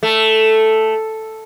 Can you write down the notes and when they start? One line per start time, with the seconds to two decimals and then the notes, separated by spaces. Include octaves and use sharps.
0.03 A3